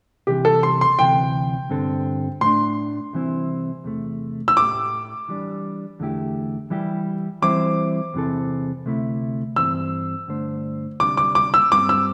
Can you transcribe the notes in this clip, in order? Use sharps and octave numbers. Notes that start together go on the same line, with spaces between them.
C2 C3 E3 G4
A4
C6
C6
D2 C3 E3 G5
G2 D3 C4 A4
A2 A3 D4 C6
C2 C3 E3 C4 E4
E2 C3 A3
E6
A2 A3 E4 G4 D6
E3 G3 D4
E2 D3 A3 E4 G4
E3 G3 E4 G4
E3 G3 C4 E4 C5 D6
E2 C3 E3 C4 A4
D2 C3 A3 E4
G2 E3 C4 E6
G2 D3 A3 D4 C5
D2 C3 G3 D4 D6
D6
D6
E6
G2 G3 C4 D6
E6